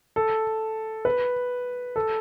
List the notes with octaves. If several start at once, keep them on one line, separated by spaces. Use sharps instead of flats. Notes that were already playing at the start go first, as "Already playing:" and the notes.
A4
B4
A4